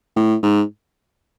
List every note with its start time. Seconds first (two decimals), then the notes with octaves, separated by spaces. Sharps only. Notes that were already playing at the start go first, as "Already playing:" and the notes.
0.16 A2
0.43 G#2